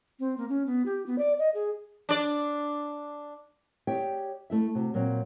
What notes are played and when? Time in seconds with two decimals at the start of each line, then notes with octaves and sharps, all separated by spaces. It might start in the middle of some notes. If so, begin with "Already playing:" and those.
0.19 C4
0.37 A#3
0.49 C#4
0.66 B3
0.86 G4
1.06 B3
1.18 D5
1.38 D#5
1.54 G#4
2.09 D4 D5
3.87 G4 G#4 C#5 D5 E5 G5
4.50 A3 E4 E5
4.75 C3 F#4
4.94 A#2 F#3 C4